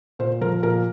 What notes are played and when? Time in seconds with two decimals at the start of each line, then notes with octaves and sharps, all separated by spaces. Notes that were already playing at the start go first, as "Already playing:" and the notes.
0.19 A#2 C5
0.41 F3 A#4
0.63 A#2 A#4